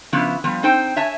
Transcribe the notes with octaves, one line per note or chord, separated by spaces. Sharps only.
C#3 F3 B3 E4
F3 G3 B3
C4 D#4 C5 G5
C#5 E5 G#5 A5